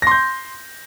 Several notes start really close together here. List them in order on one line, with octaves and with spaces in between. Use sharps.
A#6 C6 G6